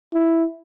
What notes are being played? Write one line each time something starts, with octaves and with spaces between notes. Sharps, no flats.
E4